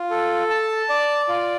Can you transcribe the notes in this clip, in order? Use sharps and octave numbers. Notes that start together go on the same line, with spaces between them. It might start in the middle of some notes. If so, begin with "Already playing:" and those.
Already playing: F4
A4
A5
D5
F4